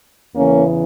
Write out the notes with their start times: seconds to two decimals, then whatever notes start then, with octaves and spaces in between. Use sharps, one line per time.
0.36 E2 C#3 E3 A#3 C#4